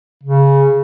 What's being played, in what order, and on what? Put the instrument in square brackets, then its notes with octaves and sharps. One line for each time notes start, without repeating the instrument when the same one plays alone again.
[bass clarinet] C#3